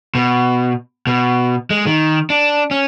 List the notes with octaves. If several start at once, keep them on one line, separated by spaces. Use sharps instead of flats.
B2
B2
G#3
D#3
D4
C#4